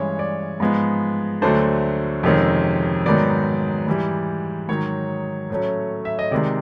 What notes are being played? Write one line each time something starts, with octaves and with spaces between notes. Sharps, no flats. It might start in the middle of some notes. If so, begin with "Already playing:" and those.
Already playing: G2 E3 G#3 C#4 C#5
D5
G#2 F3 G#3 B3
D2 D3 F#3 A3 D4 C5
F2 C3 D#3 G#3 C#4
G#2 D#3 F#3 B3 D5
G#2 E3 G3
G#2 D#3 F#3 C#5
A2 F#3 A3 C#4
E5
D#5
C3 D#3 G#3 D5